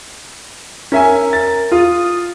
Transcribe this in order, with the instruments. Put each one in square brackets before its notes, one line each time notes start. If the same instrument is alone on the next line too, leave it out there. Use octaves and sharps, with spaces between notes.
[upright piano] C#4 E5 G#5 [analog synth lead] A#4
[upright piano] A6
[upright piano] F4 [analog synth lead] D#6